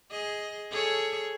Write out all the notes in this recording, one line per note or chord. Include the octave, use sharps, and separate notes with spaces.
G#4 D#5
G#4 A4 C#5